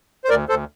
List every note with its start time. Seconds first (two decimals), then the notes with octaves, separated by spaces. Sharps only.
0.25 C5
0.29 D2 A#4 D5
0.49 D2 A4 C5